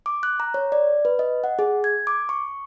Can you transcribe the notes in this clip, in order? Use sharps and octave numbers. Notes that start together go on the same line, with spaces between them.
D6
F#6
A#5
C#5
D5
B4
D#5
F#5
G#4
G#6
D6
C#6